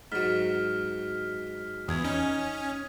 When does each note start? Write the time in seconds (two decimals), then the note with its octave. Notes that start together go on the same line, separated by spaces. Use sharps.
0.12 G#2 F#3 F6 B6
1.88 E2 D#6 G#6
2.05 C#4 D#4